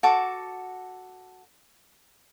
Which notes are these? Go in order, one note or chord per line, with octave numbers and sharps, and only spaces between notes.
F#4 A4 A5 D6